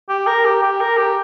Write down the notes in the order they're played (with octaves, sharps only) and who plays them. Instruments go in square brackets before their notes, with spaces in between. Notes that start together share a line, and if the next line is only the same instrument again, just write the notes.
[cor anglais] G4
A#4
G4
G4
A#4
G4